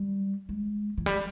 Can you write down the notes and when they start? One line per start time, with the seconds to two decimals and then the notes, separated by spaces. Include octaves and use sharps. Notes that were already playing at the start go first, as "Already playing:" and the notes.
Already playing: G3
0.49 G#3
0.98 E3
1.06 G3